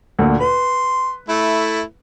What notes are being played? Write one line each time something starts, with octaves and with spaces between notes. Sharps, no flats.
D2 A#2
B4 C6
A3 E4